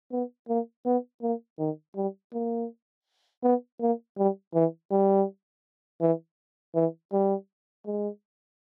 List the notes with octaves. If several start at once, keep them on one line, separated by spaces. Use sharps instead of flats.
B3
A#3
B3
A#3
D#3
G3
A#3
B3
A#3
G3
E3
G3
E3
E3
G3
G#3